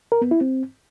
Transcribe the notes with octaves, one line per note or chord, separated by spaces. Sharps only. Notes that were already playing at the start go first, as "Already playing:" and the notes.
A#4
B3
E4
C4